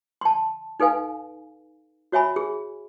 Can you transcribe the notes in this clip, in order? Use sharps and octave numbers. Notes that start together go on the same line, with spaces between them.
A5 C6
D#4 A4 B4 F5 G#5
F#4 C#5 E5 G#5 B5
G#4